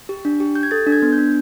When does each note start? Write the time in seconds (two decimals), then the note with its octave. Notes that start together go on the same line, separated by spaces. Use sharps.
0.09 G4
0.25 D4
0.40 G4
0.55 G4 G6
0.63 G#6
0.71 A4 A6
0.87 D4
0.92 G#6
1.02 B3
1.13 G6
1.18 D4